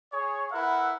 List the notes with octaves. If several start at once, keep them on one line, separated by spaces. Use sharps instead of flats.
G#4 C#5
E4 A#4 B4 E5 F#5